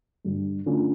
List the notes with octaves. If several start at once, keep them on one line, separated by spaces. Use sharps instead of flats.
G2 D3 G3
D3 A3 C#4 F4